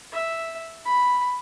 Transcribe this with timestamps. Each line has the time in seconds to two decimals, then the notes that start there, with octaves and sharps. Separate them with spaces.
0.12 E5
0.85 B5